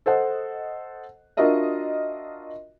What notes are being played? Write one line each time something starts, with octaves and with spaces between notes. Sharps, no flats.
A4 C5 D#5 F#5
D4 F4 F#4 A#4 D#5 E5